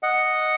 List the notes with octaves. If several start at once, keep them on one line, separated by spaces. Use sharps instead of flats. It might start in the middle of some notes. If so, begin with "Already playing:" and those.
D#5 F#5